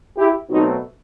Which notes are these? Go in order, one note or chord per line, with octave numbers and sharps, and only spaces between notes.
E4 G4
B2 F#3 A3 C4 D#4 F#4